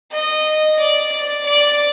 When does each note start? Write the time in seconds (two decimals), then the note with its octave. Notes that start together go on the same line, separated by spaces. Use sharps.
0.11 D#5
0.78 D5
1.11 D5
1.45 D5